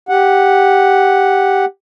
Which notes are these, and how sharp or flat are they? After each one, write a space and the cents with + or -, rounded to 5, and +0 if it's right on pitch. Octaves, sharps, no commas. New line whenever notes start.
G4 +0 F#5 +0